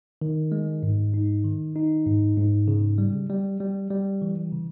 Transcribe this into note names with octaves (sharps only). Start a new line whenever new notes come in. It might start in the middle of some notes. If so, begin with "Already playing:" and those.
D#3
G#3
G#2
D#4
D#3
D#4
G#2
G#2
C#3
G3
G3
G3
G3
E3
C#3